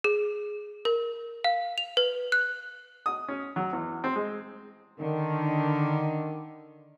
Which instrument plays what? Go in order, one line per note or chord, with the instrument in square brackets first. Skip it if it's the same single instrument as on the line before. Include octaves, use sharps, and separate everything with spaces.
[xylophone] G#4
A#4
F5
F7
B4
F#6
[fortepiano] D#6
C#4
F#3
E2
C4
G#3
[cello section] D3 [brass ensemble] D#3